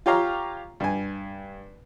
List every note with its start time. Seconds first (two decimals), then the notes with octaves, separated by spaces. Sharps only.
0.06 F4 G4 C#5 F5 A#5
0.80 G2 G#5